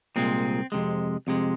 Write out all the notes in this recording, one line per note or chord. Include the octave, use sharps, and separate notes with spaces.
C2 A#2 G#3 C4
F2 C3 G#3
F2 C3 G#3